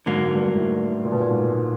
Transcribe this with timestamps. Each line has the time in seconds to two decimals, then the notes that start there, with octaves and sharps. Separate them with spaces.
0.06 G#2 D3 F#3 A#3
0.35 G2
0.45 G#2
0.56 A2
1.05 A#2
1.12 B2
1.20 A#2
1.29 G#2